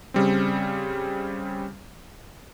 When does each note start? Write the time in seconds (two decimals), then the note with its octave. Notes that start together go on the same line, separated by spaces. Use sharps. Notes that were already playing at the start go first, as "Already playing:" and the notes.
0.14 C#3 G3 C4